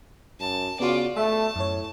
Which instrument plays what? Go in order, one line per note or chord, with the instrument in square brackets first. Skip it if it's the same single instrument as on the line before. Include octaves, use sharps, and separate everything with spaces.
[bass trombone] F#2 [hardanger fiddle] A5
[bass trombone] C#3 [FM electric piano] B3 F#4 [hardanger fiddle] F4 D5
[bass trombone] A3 [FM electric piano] E5 [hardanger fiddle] A5
[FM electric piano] F#2 C#5 [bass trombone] A2